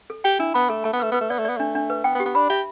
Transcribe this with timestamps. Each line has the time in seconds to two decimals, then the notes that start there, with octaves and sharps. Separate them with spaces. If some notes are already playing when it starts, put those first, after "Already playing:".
0.10 A4
0.24 G4 G5
0.39 D4 E4
0.54 B3 B5
0.69 A3 A4
0.84 A3 A5
0.93 B3
1.00 A3 B4
1.12 B3 B4
1.21 A3
1.30 B3 D5
1.39 A3
1.45 B3 D5
1.57 A3 D4
1.75 D4
1.90 B4
2.04 B3 G5
2.15 B3
2.20 G4
2.25 B3
2.35 D4 B5
2.50 G4 E5